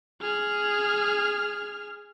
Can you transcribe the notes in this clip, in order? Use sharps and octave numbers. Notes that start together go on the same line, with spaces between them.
G#4 F6